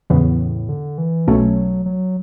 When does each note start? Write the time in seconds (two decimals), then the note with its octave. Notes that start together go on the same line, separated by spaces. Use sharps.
0.10 E2 A2 C#3 E3 B3
0.69 D3
0.98 E3
1.27 B1 B2 F#3 A3 C#4
1.86 F#3